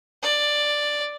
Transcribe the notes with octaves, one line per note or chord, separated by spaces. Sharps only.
D5